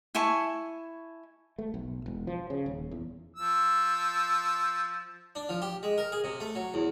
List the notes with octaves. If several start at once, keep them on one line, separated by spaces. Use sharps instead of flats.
E4 G#5 A5 C#6
A3
B1
E1
F3
C#3
D#1
E2
F3 E6
D4
F3
G4
G#3
A#4
G#4
C3
A3
F#3
E2